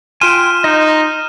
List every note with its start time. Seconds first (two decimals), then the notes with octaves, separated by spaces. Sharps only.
0.21 F4 G5 G#5 C6 F6 D#7 E7
0.64 D#4 D#5 G6